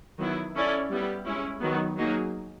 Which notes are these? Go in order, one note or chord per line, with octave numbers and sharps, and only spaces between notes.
D#3 F#3 B3 E4
C#4 E4 A4 D5
G3 B3 E4 G4
G#3 C#4 E4
D#3 F#3 B3
F#3 A#3 D#4 G#4